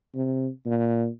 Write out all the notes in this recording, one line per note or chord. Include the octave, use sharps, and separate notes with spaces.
C3
A#2